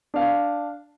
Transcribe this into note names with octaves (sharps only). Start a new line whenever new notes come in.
D4 F5